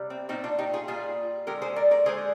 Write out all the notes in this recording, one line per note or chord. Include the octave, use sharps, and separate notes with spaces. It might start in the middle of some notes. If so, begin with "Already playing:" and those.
Already playing: C3 G3
C4
A#2 G3 C4 D#4
D4 F4
D#4 G4
F4 G#4
A#2 G3 F4 G#4
D3 G#3 G4 A#4
G#4 C5
A#4 D5
A#4 D5
D3 G#3 G#4 C5